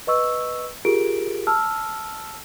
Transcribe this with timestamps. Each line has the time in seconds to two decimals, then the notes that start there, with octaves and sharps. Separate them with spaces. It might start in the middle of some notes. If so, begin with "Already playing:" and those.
0.07 B4 D#5 C#6 E6
0.85 F4 G4 G#4 A#4 D7
1.47 A5 E6 F6